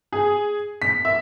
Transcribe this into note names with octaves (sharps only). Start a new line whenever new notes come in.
G#4
B6
E5